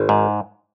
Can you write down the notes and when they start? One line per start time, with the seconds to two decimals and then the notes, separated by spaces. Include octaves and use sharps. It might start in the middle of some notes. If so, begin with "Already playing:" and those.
Already playing: G#1
0.09 G#2